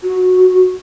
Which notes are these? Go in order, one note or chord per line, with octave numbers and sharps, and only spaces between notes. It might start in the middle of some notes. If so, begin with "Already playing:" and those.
F#4